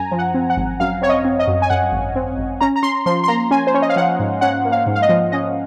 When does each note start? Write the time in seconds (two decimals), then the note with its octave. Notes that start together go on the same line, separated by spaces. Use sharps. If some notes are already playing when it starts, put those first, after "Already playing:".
Already playing: F#2 G#5 A#5
0.11 F3
0.19 F#5
0.34 C4
0.50 F#5
0.57 G#1
0.80 F#2 F5
1.02 C4 C#5
1.09 D#5
1.25 C4
1.39 D#5
1.48 F#2
1.62 G#5
1.70 F#2 F#5
1.92 G#1
2.16 C4
2.38 G#1
2.61 C#4 A#5
2.76 A#5
2.83 C#4 C6
3.06 F3 C6
3.24 C6
3.28 A#3 A#5
3.51 C#4 G#5
3.67 C5
3.74 C#4 C#5
3.82 D#5
3.89 F5
3.96 F3 F#5
4.19 G#2
4.41 C#4 F#5
4.65 A#3
4.72 F5
4.87 G#2
4.95 F5
5.02 D#5
5.09 F3
5.32 C#4 D#5